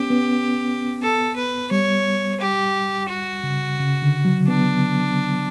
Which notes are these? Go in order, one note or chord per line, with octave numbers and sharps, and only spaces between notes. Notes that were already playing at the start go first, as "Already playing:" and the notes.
Already playing: B3 C#4 G4
B3
A4
B4
G3 C#5
G4
F#4
C#3
C#3
D3
F#3
B3 D4